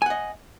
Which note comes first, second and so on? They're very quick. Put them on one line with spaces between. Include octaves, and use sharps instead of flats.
G#5 F#5 D#5